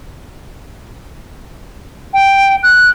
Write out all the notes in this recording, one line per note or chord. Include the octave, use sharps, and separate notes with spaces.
G5
F#6